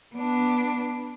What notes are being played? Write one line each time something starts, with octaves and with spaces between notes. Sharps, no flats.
B3 D4